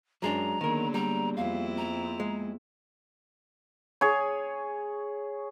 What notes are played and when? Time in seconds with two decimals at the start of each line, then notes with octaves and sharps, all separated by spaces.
0.22 F#2 F#3 G#3 D4 A#5
0.61 D3 D#3 F#3 A#3 B3 G#4 A#4
0.94 G3 A#5
1.37 F2 C4 E4 F5
1.77 A#5
2.20 G#3
4.01 G#4 C#5